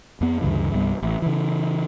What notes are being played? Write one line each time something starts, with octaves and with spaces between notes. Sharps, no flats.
F2 B3
D2 G2 C#3 E3
C2 G2 G3 B3
A1
C#3 E3